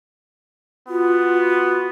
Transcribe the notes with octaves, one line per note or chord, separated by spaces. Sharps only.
B3 F4 F#4